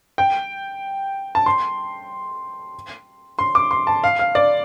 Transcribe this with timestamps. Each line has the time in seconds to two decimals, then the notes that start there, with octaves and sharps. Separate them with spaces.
0.18 G5
1.35 A5
1.46 C6
3.39 C6
3.55 D6
3.71 C6
3.87 A5
4.04 F5
4.19 F5
4.35 D5